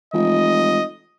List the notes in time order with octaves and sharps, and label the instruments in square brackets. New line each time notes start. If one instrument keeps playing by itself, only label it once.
[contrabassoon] F1 [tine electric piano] E3 G#3 F4 [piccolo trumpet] D#5